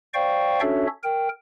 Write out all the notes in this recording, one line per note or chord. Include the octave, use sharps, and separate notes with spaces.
C5 D5 F5 G5 C#6
C#4 D4 F#4 A4 C#5 E5
A#4 G5